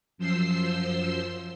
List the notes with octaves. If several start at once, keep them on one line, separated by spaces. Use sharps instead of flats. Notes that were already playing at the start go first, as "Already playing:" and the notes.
F#2 F3 C5 C6 E6 C7